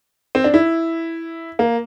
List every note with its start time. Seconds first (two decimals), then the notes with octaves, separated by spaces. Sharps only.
0.35 C4
0.44 D4
0.54 E4
1.59 A#3